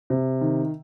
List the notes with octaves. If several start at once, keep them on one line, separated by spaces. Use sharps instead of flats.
C3
D#3